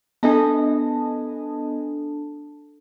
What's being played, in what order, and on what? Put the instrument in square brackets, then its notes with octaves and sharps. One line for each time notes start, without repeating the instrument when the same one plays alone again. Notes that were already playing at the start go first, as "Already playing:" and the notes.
[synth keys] B3 D#5 G#5 [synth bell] D4 A4 A5